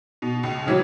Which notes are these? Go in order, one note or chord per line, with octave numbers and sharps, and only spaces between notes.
B2
C#2
C#3 E3 F#3